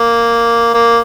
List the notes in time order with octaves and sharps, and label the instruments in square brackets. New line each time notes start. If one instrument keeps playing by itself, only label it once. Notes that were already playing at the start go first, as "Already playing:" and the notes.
Already playing: [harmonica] A#3
A#3